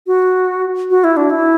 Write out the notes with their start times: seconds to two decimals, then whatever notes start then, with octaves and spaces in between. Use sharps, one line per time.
0.07 F#4
0.90 F#4
1.04 E4
1.17 D4
1.30 E4